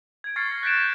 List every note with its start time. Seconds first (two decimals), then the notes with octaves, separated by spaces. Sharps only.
0.24 G#6 D7
0.36 C#6 F6 G#6 A6 C7 C#7
0.50 G#6 A#6 C7
0.63 F#6 G6 B6 D7 E7